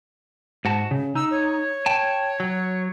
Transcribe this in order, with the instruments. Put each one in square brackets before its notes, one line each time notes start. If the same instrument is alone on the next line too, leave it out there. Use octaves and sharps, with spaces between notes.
[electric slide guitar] G#2 F#4 A5
C#3
[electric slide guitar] D#4 [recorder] E6
[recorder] C#5
[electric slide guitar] G5 A5
F#3